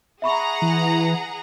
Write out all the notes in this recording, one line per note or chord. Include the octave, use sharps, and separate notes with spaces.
G#4 E5 F#5 A#5 B5 C#6
E3